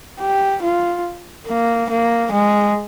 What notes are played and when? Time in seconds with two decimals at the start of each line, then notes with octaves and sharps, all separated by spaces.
0.20 G4
0.62 F4
1.48 A#3
1.90 A#3
2.32 G#3